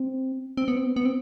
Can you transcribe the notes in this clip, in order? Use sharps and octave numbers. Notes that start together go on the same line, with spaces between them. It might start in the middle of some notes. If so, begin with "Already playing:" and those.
Already playing: C4
C4
B3
C4
B3
B3
C4